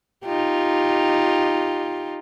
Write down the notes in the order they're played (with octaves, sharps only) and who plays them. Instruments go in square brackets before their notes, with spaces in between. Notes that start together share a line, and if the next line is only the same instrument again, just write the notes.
[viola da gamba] D#4 F4 G4